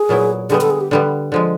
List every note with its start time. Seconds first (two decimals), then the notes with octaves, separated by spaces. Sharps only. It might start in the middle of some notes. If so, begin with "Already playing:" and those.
Already playing: G#4
0.09 A#2 F#3 B3 E4
0.50 D3 G3 B3 G#4
0.61 A4
0.70 G#4
0.81 G4
0.91 D3 G3 B3
1.32 D3 F3 G#3